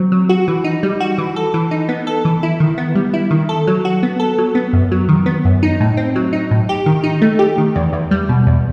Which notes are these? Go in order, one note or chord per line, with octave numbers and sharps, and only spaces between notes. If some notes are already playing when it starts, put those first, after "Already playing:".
Already playing: F#3 C4
F#3
F#4
E3
D#4
G3
F#4
E3
A4
E3
D#4
B3
A4
E3
E4
D#3
B3
G3
E4
D#3
A4
F#3
F#4
B3
A4
F#3
B3
F#2
F#3
D#3
B3
F#2
D#4
A2
C4
F#3
D#4
A2
G4
D#3
D#4
A3
G4
D#3
E2
E2
G3
B2
E2